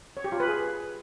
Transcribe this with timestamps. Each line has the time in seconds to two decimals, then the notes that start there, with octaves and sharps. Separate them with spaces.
0.17 C#5
0.24 G4
0.32 F4
0.40 B4
0.48 G#4